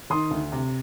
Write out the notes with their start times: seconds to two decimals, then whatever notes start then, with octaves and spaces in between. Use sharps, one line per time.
0.10 D#3 C6 D#6
0.31 D2
0.52 C3